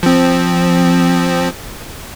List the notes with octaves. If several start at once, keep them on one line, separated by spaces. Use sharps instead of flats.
F3 C4